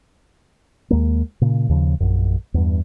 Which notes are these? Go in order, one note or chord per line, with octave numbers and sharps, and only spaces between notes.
D#2 G#3 A#3
A#2 C#3
D#2 C#3 F3
A#1 F#2
E2 G2